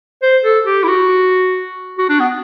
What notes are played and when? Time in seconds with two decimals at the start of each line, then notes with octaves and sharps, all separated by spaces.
0.22 C5
0.44 A4
0.66 G4
0.83 E4
0.88 F#4
1.99 F#4
2.09 D4
2.20 B3